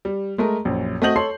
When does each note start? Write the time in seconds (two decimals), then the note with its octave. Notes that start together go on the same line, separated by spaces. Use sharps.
0.05 G3
0.38 G#3 A3 A#4
0.65 A#1 F#2
1.02 A3 C4 F#4 D#5 G6 F#7
1.16 A4 C#5 C6 C7